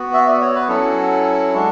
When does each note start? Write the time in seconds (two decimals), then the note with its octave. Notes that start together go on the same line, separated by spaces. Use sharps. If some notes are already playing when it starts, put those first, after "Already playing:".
Already playing: B3 F#4
0.14 E5
0.27 D5
0.41 C#5
0.55 B4
0.68 F#3 C#4 E4 A4
1.54 G#3 D4 F#4